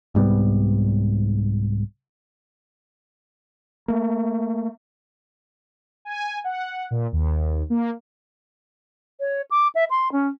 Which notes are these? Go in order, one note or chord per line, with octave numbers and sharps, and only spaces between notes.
C2 G#2 G3 B3
A3 A#3
G#5
F#5
A#2
D#2
A#3
C#5
D6
E5
C6
C#4